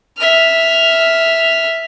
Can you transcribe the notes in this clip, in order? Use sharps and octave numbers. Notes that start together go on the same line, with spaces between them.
E5 F6